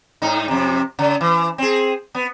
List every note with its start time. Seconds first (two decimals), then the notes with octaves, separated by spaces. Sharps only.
0.22 G#2 D#4
0.48 F2 C3
0.99 C#3
1.21 E3
1.58 C4 G#4
2.15 B3